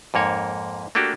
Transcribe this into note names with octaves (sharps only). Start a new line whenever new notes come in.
F2 G#2 A#3 C#5
A3 A#3 D4 F#4 G4